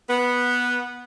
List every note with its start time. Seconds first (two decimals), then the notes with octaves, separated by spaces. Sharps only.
0.09 B3